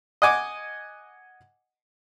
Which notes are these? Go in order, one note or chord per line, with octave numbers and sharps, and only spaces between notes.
D#5 F#5 G#5 D6